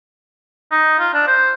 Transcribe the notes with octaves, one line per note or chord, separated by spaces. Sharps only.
D#4
F4
D4
C5